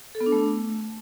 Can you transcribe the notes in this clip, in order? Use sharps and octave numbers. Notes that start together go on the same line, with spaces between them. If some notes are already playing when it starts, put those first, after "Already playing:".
A4
B3
D4
A3